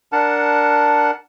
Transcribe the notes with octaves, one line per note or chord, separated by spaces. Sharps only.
D4 A#4 F#5 A5